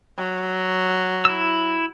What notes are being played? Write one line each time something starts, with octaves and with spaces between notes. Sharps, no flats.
F#3
E4 E6